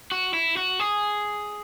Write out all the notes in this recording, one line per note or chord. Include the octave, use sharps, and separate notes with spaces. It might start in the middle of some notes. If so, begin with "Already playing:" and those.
F#4
E4
F#4
G#4